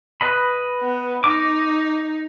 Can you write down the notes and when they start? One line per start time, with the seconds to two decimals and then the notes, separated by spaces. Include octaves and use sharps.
0.21 B4 D#5 B5
0.81 B3
1.24 D#4 D#5 D6